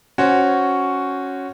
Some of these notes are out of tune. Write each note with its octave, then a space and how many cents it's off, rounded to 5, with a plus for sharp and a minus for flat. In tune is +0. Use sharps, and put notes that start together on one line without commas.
C#4 +0 F#4 +0 C5 +0